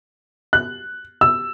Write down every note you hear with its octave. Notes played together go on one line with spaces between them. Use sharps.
F#6
E6